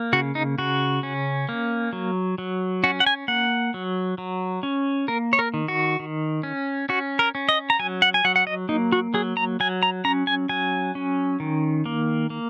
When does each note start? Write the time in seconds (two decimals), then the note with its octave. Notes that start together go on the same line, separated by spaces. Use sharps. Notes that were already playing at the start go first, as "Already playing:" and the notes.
Already playing: A#3
0.13 C#3 F#4
0.35 D#4
0.58 C#3 F#4
1.03 C#4
1.49 A#3
1.93 F#3
2.38 F#3
2.84 C#4 F#4
3.00 F#5
3.06 G#5
3.28 A#3 F#5
3.74 F#3
4.18 F#3
4.63 C#4
5.08 A#3 A#4
5.33 C#5
5.39 A#4
5.54 D#3
5.68 F#4
6.00 D#3
6.43 C#4
6.89 C#4 F#4
7.19 A#4
7.35 C#4
7.49 D#5
7.70 A#5
7.79 F#3 G#5
8.02 F#5
8.14 G#5
8.25 F#3 F#5
8.36 F#5
8.47 D#5
8.69 A#3 D#4
8.92 F#4
9.14 F#3 G#4
9.37 A#5
9.60 F#3 G#5
9.83 A#5
10.05 C#4 A#5
10.27 G#5
10.49 F#3 G#5
10.95 C#4
11.40 D#3
11.86 A#3
12.30 A#3